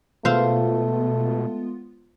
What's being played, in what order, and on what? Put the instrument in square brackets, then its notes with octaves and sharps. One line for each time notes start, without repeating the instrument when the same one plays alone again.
[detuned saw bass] B2 [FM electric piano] G#3 B3 F4 [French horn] A3 [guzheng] C5 F5